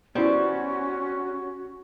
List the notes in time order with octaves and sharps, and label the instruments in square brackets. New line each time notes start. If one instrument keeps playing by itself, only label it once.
[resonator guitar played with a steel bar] G3 C5 [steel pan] B3 E4 [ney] C#4 [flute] F#4